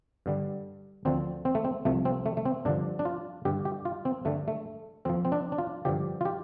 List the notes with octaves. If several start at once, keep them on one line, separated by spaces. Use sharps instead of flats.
G2 D3 G3
D2 D3 F3 C4
C4
A3
C4
C2 C3 F3 A3
C4
A3
A3
C4
G2 D3 F3 D4
D4
F4
G2 D3 G3 G4
G4
F4
C4
G2 D3 G3 A3
A3
F2 F3 C4
C4
D4
D4
F4
G2 D3 F3 G4
F4
G4